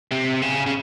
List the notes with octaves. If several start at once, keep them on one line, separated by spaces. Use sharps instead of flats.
C3
C#3
C#3